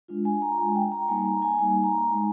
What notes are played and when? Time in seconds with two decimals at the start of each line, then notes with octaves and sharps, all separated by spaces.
0.08 G#3 D4 F4
0.25 G#5
0.42 A#5
0.58 G#3 D4 F4 G#5
0.76 G5
0.92 A#5
1.08 G3 A#3 D#4 G#5
1.25 A#5
1.42 G#5
1.59 G3 A#3 D#4 G#5
1.84 A#5
2.09 G#3 D#4 G#5